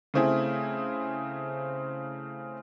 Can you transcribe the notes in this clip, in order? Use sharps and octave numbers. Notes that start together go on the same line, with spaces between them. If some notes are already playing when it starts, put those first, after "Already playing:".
C#3 A3 C4 E4 G#4